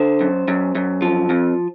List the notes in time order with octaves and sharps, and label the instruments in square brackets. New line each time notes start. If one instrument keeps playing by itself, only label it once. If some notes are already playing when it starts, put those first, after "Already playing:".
Already playing: [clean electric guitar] D3 C5
F#2
F#2
F#2
F3
F2